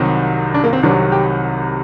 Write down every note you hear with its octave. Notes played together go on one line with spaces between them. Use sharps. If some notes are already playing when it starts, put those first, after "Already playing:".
Already playing: C2 C3 D#3 F#3
D4
A#3
C4
C2 C3 D#3 F#3 D4
G4